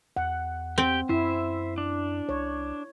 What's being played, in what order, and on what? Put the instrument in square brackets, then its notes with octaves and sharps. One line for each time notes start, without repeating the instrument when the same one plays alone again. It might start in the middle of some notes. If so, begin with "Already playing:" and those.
[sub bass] E2 [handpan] F#5
[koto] C4 [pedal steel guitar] G4 G5
[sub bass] F#2 [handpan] E4 [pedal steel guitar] C5 E5
[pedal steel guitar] D4
[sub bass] C2 [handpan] C#5